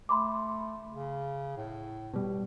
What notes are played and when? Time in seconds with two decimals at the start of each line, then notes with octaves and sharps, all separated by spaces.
0.09 A3 B5 C6 D6
0.91 C#3
1.57 A2
2.14 B2 G3